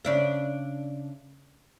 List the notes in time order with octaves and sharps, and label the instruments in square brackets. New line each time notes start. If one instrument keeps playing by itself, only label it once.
[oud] C#3 D4 E5